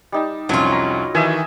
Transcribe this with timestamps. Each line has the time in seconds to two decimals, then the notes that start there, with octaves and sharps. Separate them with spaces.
0.12 G3 D#4 A5
0.49 C2 F2 F#3 C#4 F4
0.72 A#5
1.15 D#3 E3 D#5 E5 G#5